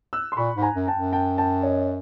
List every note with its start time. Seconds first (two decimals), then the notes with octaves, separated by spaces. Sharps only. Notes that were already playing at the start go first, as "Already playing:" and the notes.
0.13 E6 F#6
0.32 C6
0.37 A#2 B5 C#6
0.56 G#2 B5
0.62 G#5 A#5
0.75 F#2
0.87 G5 A5
0.94 F#2
1.13 G5 A5
1.38 G5 A5
1.63 C#5 D#5